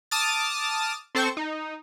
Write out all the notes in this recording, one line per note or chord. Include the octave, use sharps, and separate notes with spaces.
A5 D6 D#6 F6 A6
C4 A4 C5 C#6
D#4